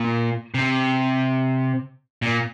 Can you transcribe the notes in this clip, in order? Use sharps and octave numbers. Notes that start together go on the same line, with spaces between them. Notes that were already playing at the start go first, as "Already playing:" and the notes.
Already playing: A#2
C3
A#2